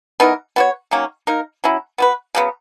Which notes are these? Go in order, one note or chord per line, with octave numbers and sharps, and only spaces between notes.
E3 B3 D#4 A#4
B3 F#4 C#5
D#3 F#3 A#3 C#4
A#3 D#4 A#4
F#3 C#4 E4
B3 F#4 B4
C#3 F#3 B3